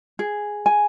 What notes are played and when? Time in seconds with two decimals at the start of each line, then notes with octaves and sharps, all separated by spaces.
0.19 G#4
0.66 G#5